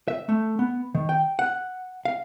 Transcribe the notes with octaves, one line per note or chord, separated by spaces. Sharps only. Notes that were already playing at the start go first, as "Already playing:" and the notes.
E5
A3
B3
D#3
G5
F#5
F5